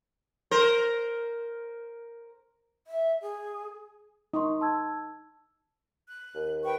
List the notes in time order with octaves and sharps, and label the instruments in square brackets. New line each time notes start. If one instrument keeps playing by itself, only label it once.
[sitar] A#4 C5
[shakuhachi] E5
G#4
[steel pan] D#4 [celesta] C6 C#6 D#6
[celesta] A5 E6 G#6
[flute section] F#6
[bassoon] D#2
[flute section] B4 G5 C#6